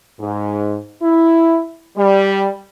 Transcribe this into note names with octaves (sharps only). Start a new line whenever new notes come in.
G#2
E4
G3